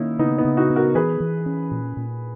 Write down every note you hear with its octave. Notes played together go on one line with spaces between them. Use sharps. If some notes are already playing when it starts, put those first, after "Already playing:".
Already playing: D#3 A#3 C#4 D#4 E4
C#3 B3 D#4
B3 D#4
C#3
D#4 F#4
B3
F#4 A#4
E3 G#4 B4
E3
C#4
A#2
A#2